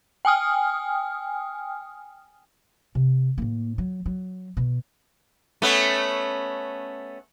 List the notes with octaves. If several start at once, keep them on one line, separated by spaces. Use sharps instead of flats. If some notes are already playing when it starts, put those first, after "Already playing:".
G5 G#5 D#6 F6
C3
A2 A#3
F#3
F#3
B2
A3 B3 C#4